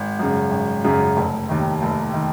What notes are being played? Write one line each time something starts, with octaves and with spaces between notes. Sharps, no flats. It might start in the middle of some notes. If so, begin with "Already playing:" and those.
Already playing: G#1
F#2 C#3
G#1
F#2 C#3
F1
D#2 D#3
F1
D#3